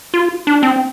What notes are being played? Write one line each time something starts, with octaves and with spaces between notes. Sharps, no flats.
F4
D4
C4